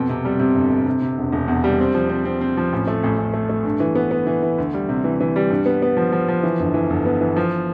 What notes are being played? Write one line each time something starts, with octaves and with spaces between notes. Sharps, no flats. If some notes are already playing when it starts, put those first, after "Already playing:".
Already playing: F2 B2
C3
G3
C3
G1
C3
C3
C3
E1
E1
E2
G3
C4
F3
C4
C4
C4
F3
A1
A3
A1
A1
A3
A3
G2
E3
B3
B3
E3
E3
D2
G3
C3
E3
E3
G3
G2
B3
B3
F3
F3
F3
E3
G1
E3
G1
B3
E3
F3